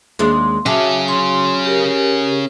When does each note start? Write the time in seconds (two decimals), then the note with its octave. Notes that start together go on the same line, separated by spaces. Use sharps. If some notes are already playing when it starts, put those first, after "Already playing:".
0.19 D#2 G#3 D4 C6
0.66 F#3 C#4 G#4 E5 A5 D6
1.08 C6
1.65 G4 A#4